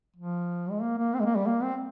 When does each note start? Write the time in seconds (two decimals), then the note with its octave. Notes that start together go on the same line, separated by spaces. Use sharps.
0.16 F3
0.70 G#3
0.82 A#3
0.98 A#3
1.14 C4
1.20 G#3
1.25 A#3
1.36 G3
1.47 A#3
1.63 C4